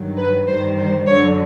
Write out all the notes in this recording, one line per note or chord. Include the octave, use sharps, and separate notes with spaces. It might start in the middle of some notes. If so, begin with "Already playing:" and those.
Already playing: G2 D#3 F#3
B4
G2 D#3 G3 C5
C5
F#2 D3 F#3 C#5